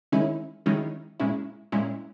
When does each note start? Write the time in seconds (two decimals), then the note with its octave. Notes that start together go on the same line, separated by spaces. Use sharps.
0.12 D#3 G#3 C#4 E4
0.66 D#3 G#3 C#4 E4
1.20 A#2 G#3 C#4 E4
1.72 A#2 G#3 C#4 E4